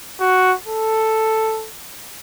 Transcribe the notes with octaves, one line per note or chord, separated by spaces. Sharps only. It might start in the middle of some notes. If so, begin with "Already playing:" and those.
F#4
A4